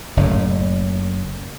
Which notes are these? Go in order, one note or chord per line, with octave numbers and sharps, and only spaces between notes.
F#1 A2